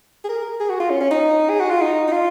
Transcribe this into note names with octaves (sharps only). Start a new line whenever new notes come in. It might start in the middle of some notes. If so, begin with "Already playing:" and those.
G#4
A#4
G#4
F#4
F4
C#4
C#4
D#4
G#4
F#4
F4
D#4
D#4
F4